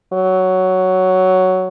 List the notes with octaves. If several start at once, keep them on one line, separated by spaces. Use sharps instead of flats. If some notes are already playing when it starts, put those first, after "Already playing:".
F#3